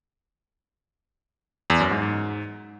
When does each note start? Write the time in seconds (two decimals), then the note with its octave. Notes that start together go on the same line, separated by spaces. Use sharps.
1.70 E2
1.80 F#2
1.91 G#2
2.02 G#2